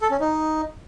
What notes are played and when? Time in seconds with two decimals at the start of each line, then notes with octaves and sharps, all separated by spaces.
0.01 A4
0.11 C#4
0.20 D#4